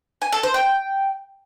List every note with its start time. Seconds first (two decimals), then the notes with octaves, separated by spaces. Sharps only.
0.22 G#5
0.32 A4
0.43 C5
0.54 G5